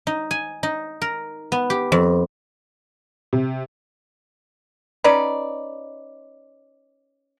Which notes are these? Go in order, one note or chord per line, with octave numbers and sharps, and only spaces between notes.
D#4
G#5
D#4
A#4
B3
G4
F2
C3
C#4 D#4 B4 D5